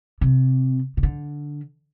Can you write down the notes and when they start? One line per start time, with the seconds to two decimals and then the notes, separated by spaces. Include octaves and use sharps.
0.21 C3
0.97 C3
1.03 D3